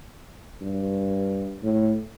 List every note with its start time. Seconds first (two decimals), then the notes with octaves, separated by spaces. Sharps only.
0.62 G2
1.63 A2